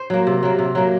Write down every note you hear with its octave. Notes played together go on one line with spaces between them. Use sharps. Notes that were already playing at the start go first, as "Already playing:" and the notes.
Already playing: C5
F#3 A#3
C3
F#3 A#3
C3
F#3 A#3